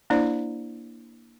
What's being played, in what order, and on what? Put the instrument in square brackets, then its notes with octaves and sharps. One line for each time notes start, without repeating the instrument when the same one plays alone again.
[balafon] A#3 D4 E4 C5 D5